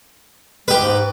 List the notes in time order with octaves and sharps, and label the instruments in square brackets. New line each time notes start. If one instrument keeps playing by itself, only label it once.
[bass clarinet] G#3 [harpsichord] G4 B4
[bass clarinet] G#2